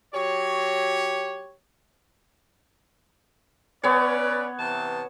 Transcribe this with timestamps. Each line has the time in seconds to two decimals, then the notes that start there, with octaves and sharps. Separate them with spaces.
0.14 F#3 G4 C#5
3.84 B3 C#4 B4 C#5 D5
4.59 C3 E3 A5